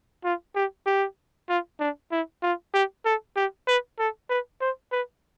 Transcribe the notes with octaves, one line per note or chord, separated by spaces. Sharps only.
F4
G4
G4
F4
D4
E4
F4
G4
A4
G4
B4
A4
B4
C5
B4